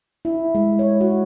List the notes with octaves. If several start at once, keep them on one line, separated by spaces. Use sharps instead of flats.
E4
G#3
C#5
F#4